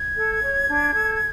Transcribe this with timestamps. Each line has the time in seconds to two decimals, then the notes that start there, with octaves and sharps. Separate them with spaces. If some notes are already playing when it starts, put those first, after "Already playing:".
Already playing: G#6
0.16 A4
0.42 C#5
0.68 D4
0.94 A4